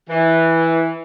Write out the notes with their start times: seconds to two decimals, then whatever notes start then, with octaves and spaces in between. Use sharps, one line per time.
0.09 E3